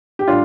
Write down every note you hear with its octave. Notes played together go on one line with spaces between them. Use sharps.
G4
A2 G3 D4 F4